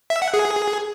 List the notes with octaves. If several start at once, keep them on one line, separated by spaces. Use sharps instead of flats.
E5
F#5
G#4